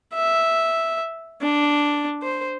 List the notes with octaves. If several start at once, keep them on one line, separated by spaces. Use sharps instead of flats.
E5
D4
C5